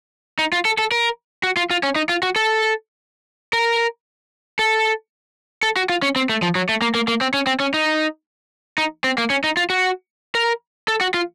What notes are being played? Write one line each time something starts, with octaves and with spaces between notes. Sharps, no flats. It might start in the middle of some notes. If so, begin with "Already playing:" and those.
D#4
F4
A4
A4
A#4
F#4
F4
F4
C#4
D#4
F4
F#4
A4
A#4
A4
A4
F#4
F4
C#4
C4
A3
F3
F#3
A3
A#3
A#3
A#3
C4
C#4
C4
C#4
D#4
D#4
C4
A#3
C#4
D#4
F4
F#4
A#4
A4
F#4
F4